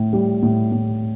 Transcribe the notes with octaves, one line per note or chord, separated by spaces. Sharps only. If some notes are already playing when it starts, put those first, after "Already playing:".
Already playing: A2
G3
A2
A2